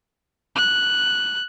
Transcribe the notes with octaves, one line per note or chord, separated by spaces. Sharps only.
F#6